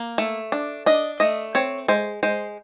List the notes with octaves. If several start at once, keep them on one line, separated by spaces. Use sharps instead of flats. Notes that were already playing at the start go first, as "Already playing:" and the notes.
Already playing: A#3
A3
D4
D4 D#5
A3 D#5
C4 C#5
G#3 C5
G#3 C5